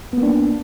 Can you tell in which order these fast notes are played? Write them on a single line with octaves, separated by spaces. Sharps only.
B3 A#3 D4